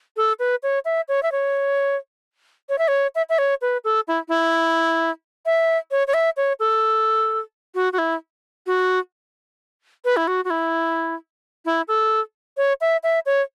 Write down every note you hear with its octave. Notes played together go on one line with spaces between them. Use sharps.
A4
B4
C#5
E5
C#5
E5
C#5
C#5
E5
C#5
E5
E5
C#5
B4
A4
E4
E4
E5
C#5
C#5
E5
C#5
A4
F#4
F#4
E4
F#4
B4
E4
F#4
F#4
E4
E4
A4
C#5
E5
E5
C#5